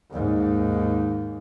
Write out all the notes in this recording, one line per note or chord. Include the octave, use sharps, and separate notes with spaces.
D#2 G#2